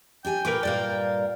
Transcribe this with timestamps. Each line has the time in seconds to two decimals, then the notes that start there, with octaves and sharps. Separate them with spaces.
0.25 D4 G4 G5 G#5
0.45 A#2 A#3 A#4 B4 D6
0.63 G2 A#2 A#4 D5 F5